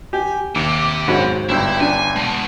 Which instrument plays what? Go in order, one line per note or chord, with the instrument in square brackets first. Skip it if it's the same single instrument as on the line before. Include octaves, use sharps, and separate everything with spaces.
[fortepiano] G4 [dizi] G#5
[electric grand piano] D#2 [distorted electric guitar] C3 [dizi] D6
[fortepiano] G#2 F#3 B5 [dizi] C5
[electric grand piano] G1 G2 G6 [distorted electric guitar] E4 [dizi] G5
[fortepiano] D4 [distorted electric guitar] G#5
[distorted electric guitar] G#3 B3 [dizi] A5